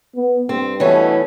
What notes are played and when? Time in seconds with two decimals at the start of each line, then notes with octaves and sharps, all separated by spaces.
0.16 B3
0.49 G2 C4
0.80 B2 E3 A3 C#4 C#5